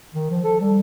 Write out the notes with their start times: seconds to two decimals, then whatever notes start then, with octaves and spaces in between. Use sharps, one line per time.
0.14 D#3
0.30 F3
0.44 A4
0.61 G3